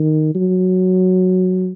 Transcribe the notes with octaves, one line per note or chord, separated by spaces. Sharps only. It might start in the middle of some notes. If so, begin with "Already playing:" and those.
Already playing: D#3
F#3